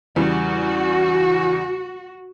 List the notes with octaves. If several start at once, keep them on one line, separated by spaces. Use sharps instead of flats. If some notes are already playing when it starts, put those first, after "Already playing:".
E2 C#3 G3 F#4